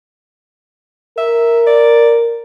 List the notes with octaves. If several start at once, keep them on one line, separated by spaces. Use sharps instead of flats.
A#4 E5
D5